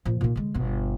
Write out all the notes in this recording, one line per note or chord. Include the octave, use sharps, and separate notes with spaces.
A#2 F3
A#2 D#4
D3 G#3
G1 B2